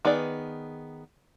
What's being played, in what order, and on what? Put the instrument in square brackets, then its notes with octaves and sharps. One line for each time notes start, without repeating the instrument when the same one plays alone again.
[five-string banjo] D#3 B3 G#4 D5